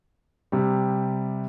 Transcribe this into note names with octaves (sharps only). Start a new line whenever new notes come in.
C3 G3